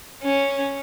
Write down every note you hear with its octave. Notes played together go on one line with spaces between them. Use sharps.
C#4